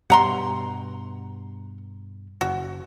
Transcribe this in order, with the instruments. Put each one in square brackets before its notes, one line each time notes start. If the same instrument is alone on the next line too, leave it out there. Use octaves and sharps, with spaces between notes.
[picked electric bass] G2 B2 G3 [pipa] F#5 A#5 C6
[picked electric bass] F#1 [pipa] F#4